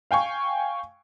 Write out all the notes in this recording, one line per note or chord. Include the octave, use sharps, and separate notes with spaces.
F5 G5 G#5 C#6